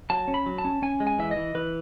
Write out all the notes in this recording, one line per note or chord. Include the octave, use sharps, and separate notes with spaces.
F#3 A5
C#4
B5
F#3
A5
C#4
C#4 G#5
G#3
G#5
E3 E5
D#5
E3
E3 B4